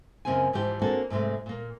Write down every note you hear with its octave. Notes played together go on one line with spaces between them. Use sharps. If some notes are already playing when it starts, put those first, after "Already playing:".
F#2 C#3 A#3 C4 G4 G#5
G#2 E3 F3 G4
A#3 C4 D4 F#4 G#4 A4
G#2 C3 G#3 A3
A#2 A#3